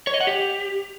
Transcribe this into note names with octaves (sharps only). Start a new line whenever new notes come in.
C#5
D#5
F#5
G4